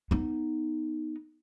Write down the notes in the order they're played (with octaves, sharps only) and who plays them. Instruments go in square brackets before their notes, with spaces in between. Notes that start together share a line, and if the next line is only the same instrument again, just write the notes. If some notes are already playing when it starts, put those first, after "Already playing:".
[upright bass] B3 D#4